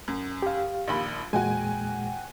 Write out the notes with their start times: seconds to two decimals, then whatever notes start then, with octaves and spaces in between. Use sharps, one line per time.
0.08 F#2
0.42 G4 F5
0.88 A#1 D#2 B5
1.33 E2 A#2 G#3 F#4 G5 G#5